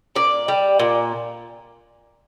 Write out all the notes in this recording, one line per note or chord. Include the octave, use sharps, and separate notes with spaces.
A#2 D5
G3
A#2